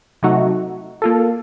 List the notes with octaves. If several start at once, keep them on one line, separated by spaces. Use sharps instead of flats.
C3 F#3 A3 D#4 F#4
A#3 F4 A4